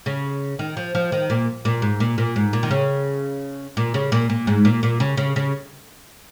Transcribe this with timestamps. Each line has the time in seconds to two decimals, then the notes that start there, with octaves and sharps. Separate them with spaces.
0.06 C#3
0.59 D#3
0.77 F3
0.95 F3
1.12 D#3
1.30 A#2
1.65 A#2
1.82 G#2
2.00 A#2
2.18 A#2
2.36 G#2
2.53 A#2
2.63 D#3
2.71 C#3
3.77 A#2
3.94 C#3
4.12 A#2
4.30 A#2
4.47 G#2
4.65 A#2
4.83 A#2
5.00 C#3
5.17 C#3
5.36 C#3